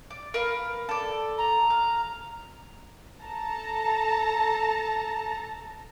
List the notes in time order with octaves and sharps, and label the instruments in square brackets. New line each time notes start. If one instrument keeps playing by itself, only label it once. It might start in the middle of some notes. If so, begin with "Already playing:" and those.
[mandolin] D5
A#4 B4 F5
A4 D5
[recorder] A#5
[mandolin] F5
[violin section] A4 A5 A#5